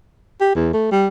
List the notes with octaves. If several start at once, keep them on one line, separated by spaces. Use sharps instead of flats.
G4
E2
A3
G3